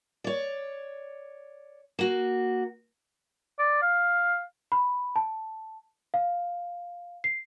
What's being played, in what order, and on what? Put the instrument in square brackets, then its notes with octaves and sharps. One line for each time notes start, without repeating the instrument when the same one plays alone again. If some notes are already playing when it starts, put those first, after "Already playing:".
[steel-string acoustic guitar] C#5 D5
A#3 F#4
[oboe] D5
F5
[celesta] B5
A5
F5
C7